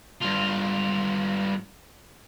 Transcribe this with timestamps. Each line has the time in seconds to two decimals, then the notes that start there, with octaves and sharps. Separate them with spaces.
0.21 G2 F4